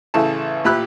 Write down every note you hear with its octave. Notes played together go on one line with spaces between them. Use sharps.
A1 C#3 E3 A4 A5
A1 A#2 G4 B5 E6 F#6